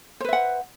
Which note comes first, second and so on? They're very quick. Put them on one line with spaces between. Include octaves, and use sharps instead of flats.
C5 B4 E5 F#5